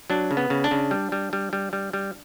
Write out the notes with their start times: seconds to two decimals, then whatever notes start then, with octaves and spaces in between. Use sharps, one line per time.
0.10 F#3 D4
0.31 C#3
0.37 B3
0.50 C#3
0.64 D4
0.71 C#3
0.91 G3
1.12 G3
1.33 G3
1.53 G3
1.73 G3
1.93 G3